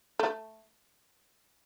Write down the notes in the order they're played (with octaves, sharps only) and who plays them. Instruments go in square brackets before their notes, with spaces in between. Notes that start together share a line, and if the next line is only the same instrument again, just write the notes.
[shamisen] A3